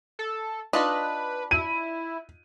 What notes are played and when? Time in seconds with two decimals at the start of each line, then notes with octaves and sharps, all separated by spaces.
0.19 A4
0.73 D4 D#4 F4 B4 D#5
1.51 E4 D#7